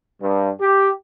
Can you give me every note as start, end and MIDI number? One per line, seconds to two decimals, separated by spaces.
0.22 0.50 43
0.61 0.90 67